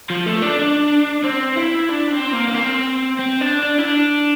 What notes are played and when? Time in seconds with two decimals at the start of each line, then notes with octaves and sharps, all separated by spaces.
0.10 F3
0.26 A3
0.42 D4
0.59 D4
1.24 C4
1.57 E4
1.89 D4
2.11 C4
2.33 A#3
2.48 A#3
2.54 C4
3.19 C4
3.41 D4
3.63 D4
3.78 E4
3.85 D4